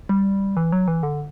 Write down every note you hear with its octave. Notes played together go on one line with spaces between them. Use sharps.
G3
E3
F#3
E3
D3